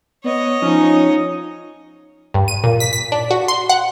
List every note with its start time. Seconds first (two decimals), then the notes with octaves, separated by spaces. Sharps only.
0.24 B3 C#5 D#5
0.62 F3 C#4 D#4
2.34 G2
2.48 D#7
2.64 A#2
2.80 B6
2.93 B6
3.12 D4
3.31 F#4
3.48 C6
3.69 F#5